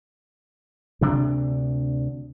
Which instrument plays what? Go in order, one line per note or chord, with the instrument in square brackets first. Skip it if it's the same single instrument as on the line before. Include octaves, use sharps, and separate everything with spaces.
[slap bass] D2 C3 D4